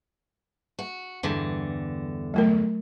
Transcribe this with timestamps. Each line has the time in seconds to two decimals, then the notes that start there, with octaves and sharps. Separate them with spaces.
0.79 F#4
1.23 E2 G2 D3
2.34 F#3 A3 A#4